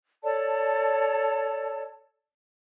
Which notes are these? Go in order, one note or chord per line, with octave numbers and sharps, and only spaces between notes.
A4 C#5 D5 A5